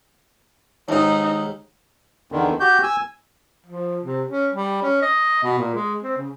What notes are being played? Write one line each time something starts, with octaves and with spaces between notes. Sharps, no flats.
D#2 G#2 D#4
E2 D3 D#3
F#4 G4 G6
G#5 E6
F3
C3
C#4
G3
C#4
D#5
B2
A#2
G#3
C4
C#3